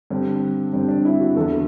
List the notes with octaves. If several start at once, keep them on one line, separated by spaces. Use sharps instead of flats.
G2 D3 C4
G2 D3 C4
D4
E4
F#4
E2 D3 A4